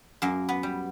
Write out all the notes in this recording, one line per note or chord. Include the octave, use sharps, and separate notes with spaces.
F#2 A#3
B3
G3